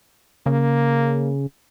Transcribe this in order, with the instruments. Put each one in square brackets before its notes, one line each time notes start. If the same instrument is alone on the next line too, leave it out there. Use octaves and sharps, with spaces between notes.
[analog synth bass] C#3 [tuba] A#3